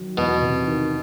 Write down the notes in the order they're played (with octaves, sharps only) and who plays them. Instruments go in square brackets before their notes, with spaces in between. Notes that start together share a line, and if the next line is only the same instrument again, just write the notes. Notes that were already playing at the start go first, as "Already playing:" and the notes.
Already playing: [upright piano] D#3 F#3
[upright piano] E2 [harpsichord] B2
[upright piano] C3
D#3